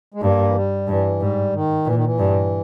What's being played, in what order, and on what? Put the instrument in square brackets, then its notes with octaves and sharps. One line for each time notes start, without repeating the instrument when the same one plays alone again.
[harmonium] G#3
[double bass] G2 [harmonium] A#3
[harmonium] E3
G3
[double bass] G2 [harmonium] E3
[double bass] G#2 [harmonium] G3
[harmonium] D#3
[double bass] A#2 [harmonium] E3
[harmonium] D#3
E3
[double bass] G2